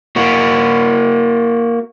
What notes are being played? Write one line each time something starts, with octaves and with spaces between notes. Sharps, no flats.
A#3 F#4